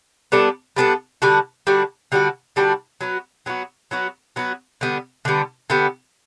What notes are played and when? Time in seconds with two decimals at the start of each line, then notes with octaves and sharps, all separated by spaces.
0.32 G3 B3 D4 A4
0.76 G3 B3 D4 A4
1.22 D3 G3 D4 F#4
1.67 D3 G3 D4 F#4
2.12 D3 G3 D4 F#4
2.56 D3 G3 D4 F#4
3.01 F#3 B3 F#4
3.46 F#3 B3 F#4
3.91 F#3 B3 F#4
4.36 F#3 B3 F#4
4.81 D3 G3 B3
5.25 D3 G3 B3
5.70 D3 G3 B3